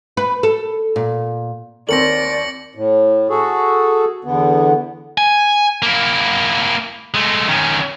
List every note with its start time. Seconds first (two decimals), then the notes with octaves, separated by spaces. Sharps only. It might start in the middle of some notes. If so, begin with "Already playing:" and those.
0.17 B4
0.43 A4
0.96 A#2
1.89 D#2 C4 A#4 D5 A#6 C#7 F#7
2.75 A2
3.30 F#4 G#4 A4
4.24 E2 D3 B3
5.18 G#5
5.82 A#3 E4
7.14 G#3 A3
7.48 D#3 C#4